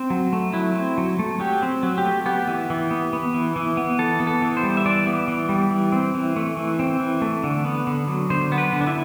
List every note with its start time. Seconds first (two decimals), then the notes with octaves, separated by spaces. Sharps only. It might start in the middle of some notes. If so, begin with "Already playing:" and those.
Already playing: C4
0.10 F#3
0.33 A3
0.54 F#3 E4
0.75 C4
0.98 F#3
1.19 A3
1.40 F#3 G4
1.62 C4
1.83 F#3
1.98 G4
2.05 A3
2.26 B3 G4
2.48 E3
2.70 E3
2.91 B3
3.13 B3
3.34 E3
3.56 E3
3.77 B3
3.99 E3 A4
4.20 B3
4.27 A4
4.42 E3
4.57 C5
4.63 G3
4.77 E5
4.85 E3 D5
5.07 B3
5.28 E3
5.49 G3
5.71 E3
5.92 C4
6.15 E3
6.36 A3
6.57 E3
6.79 C4
7.00 E3
7.22 A3
7.44 D3
7.65 B3
7.87 D3
8.08 F#3
8.30 D3 C5
8.52 B3
8.58 B4
8.72 D3
8.81 D4
8.87 E4